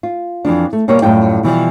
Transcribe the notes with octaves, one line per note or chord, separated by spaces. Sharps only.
F4
F2 E3 F3 D4
A3
B2 G3 A#3 C#5
F#2 A2 G3 F4 G5
B2 E3 F3 G3